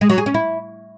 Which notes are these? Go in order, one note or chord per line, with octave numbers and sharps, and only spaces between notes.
G#3
F#3
G#4
C#4
E4